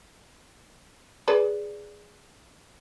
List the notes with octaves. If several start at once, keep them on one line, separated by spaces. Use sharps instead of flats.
G#4 B4 D5